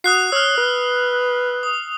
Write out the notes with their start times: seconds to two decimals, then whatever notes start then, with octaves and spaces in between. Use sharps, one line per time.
0.04 F#4 D#6 F#6 C7
0.32 C#5 E6 F6
0.57 B4
1.63 D#6